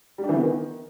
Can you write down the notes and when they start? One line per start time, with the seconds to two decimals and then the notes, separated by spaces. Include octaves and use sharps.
0.18 G3
0.24 D4
0.29 E3
0.34 B3
0.40 D#3